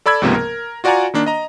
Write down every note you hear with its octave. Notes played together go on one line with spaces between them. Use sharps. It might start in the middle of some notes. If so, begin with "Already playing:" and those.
A4 D5 B5 E6 G#6
C#2 G#2 C3 F3 A#3 B3
A#4
F4 F#4 D5 F#5 G#5 A#5
D#3 A#3 D4
D#5 A#5